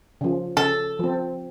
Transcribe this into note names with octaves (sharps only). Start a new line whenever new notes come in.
C#3 F3
C#3 A4
F3 C4